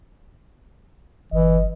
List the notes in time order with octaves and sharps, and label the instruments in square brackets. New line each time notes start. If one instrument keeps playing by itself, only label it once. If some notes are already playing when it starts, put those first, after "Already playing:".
[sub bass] G1 [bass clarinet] E3 [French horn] D#5